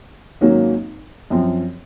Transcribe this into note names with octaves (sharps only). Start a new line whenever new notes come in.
G#1 G#2 F#3 A#3 C#4
F#2 F3 C4